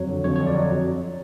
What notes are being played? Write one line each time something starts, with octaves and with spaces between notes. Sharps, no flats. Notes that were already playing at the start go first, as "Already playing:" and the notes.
Already playing: F2 F#3 C#5
D3
F2 C#5
C#5
F2
D5
F#3 D#5